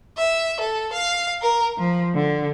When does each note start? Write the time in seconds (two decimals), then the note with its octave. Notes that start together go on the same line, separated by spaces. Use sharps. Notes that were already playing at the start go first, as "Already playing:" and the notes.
0.17 E5
0.59 A4
0.92 F5
1.40 A#4
1.77 F3
2.15 D3